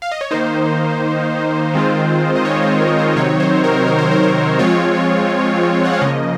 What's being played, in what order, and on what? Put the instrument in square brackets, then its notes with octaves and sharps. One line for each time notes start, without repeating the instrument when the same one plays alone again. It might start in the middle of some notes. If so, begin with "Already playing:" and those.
[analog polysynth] F5
D#5
C#5
D#3 A#3 D#4 C5
D#3 G#3 C4 F4
D#5
C#5
C5
A#4
C5
C3 D#3 F#3 C4 D#4 C#5
C5
A#4
A#4
C5
A#4
C5
F3 G#3 C4 F4 C#5
F#5
F5
C#3 F3 A#3 D#5